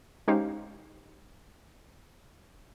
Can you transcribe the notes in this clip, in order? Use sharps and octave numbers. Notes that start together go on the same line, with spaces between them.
G#3 C#4 D#4 G4 C5 F5